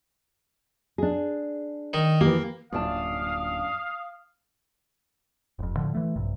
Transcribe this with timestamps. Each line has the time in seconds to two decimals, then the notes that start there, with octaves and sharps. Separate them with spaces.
0.98 D4 G#4
1.93 D#3 D#4
2.21 E3 A#3 G4
2.73 D1 F#2 A#2 D4 F5 A5 D#6
5.59 F1 F2
5.76 A2 D3 F3
5.95 E3 A3
6.16 A#1 G2 C3